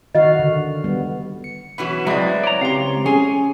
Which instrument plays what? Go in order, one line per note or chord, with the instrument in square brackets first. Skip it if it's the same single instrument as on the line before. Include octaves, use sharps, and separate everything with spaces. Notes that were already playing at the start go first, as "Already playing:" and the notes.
[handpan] D#3 F#4 F5 [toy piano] D#5
[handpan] D3
G3 B3
[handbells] C#7
[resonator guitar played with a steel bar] B2 E3 F#3 [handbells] F#4 B5
[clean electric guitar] F#3 G#3 C4 [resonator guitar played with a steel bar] E4 [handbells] B4 D5
[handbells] C#5 [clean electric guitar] D5 A#5
[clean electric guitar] C#2 F5 [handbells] C4 G4 C6
[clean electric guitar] C#4 [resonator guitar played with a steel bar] G#4